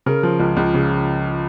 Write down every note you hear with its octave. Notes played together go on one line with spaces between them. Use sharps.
C#3 A#4
F3
C#2
C#2
C#3